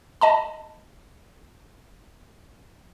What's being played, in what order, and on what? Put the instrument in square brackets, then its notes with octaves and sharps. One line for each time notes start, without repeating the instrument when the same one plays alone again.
[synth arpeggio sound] D#5 A5 B5